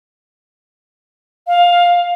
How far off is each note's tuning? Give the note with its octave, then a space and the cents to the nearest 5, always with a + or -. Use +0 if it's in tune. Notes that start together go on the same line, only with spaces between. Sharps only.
F5 +10